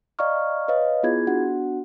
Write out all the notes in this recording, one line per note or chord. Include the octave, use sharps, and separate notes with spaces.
D5 D#5 F5 A#5 C#6 F6
B4 C#5 D#5 F5
B3 E4 F4 G#4 G#6
B3 D4 F#4 F#5